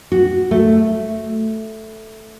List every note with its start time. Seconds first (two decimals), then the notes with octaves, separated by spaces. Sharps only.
0.12 F#4
0.51 A3